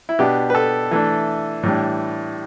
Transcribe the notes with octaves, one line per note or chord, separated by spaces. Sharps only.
E4
B2 B3 D4 G4
B4
A4
E3 A3 D4
A2 E3 G3 D4